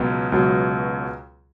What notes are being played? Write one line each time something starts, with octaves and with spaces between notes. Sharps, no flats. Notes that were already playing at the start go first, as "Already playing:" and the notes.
Already playing: C#2 B2 F#3 B3
C#2 B2 F#3 B3